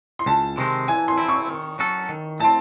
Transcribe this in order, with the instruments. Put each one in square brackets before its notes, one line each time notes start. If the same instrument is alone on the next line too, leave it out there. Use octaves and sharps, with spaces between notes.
[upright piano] C6
[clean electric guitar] C#2 [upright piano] A5
[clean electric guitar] C3 D#3 G#3 C4
[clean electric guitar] E3 [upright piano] G#5
[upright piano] C6
[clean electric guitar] C4 E4
[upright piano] C#6
[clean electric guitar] D#3
F#3 C#4 F#4 A4
D#3
[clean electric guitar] A3 C4 [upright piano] A5